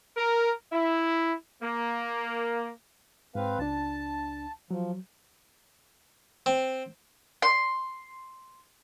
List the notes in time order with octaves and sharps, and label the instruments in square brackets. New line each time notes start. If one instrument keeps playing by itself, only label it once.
[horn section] A#4
E4
A#3
[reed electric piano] G#2 [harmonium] C4 B4 F5
[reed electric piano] C#2 D4 [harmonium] A5
[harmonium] F3 [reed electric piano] F#3
[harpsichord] C4
[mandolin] C6